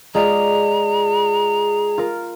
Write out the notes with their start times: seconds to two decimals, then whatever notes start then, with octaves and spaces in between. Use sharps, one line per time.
0.14 G#3 F4 G#4 D5 A#5
1.98 F4 A#4